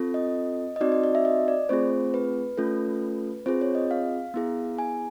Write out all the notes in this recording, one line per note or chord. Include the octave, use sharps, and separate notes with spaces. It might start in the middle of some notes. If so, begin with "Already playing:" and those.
Already playing: C4 F4 A4
D#5
D#5
C4 D#4 F#4 D5
D#5
D5
E5
D#5
D5
A3 C4 F4 G#4 C5
B4
A3 C#4 F4 A4
C4 F4 G#4 C5
C#5
D#5
F5
B3 E4 G#4
G#5